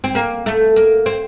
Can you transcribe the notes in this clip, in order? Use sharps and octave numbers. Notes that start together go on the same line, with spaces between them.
C4
A#3
A3
A#3
C4